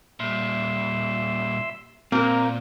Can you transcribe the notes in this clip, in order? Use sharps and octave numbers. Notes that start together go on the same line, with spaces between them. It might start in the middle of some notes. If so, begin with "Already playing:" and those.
A#2 G3 E5 C6 E6
A#2 A#3 C4 A#4